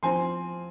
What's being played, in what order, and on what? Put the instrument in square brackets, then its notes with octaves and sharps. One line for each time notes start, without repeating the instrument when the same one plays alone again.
[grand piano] F3 C4 G#5 C6